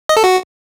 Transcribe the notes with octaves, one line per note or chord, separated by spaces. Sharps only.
D#5
A4
F#4